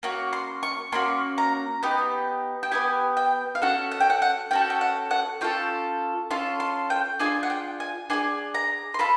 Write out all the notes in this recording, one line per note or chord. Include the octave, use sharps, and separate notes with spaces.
A#3 C#4 F#4
C6
C#6
A#3 C#4 F#4 C6
A#5
B3 D#4 G4
G5
B3 D#4 G4 G#5
G5
F5
C#4 F#4 A4 F#5
F#5
G5
F#5
F#5
C#4 F#4 A4 G5
G5
F#5
F#5
C#4 F4 A4 G5
C#4 F4 A4 C6
C6
G5
D4 F4 G#4 G#5
F#5
G5
G#5
D4 F4 G#4 G#5
A#5
C6
F4 A4 B5